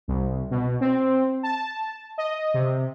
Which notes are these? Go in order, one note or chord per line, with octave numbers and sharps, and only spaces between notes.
C2
B2
C4
A5
D#5
C3